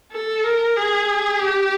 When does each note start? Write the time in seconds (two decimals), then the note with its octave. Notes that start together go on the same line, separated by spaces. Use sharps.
0.12 A4
0.44 A#4
0.76 G#4
1.39 G4